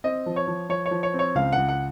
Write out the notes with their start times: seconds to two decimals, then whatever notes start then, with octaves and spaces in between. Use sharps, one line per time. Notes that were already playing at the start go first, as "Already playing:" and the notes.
0.04 C4 D#5
0.26 F3
0.36 C#5
0.47 F3
0.69 F3 C#5
0.86 C#5
0.91 F3
1.03 C#5
1.14 C4
1.19 C#5
1.35 C#2 F5
1.53 C#2 F#5
1.69 F#5